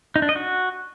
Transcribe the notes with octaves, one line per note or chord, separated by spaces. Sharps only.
D#4
D4
D#5
F#4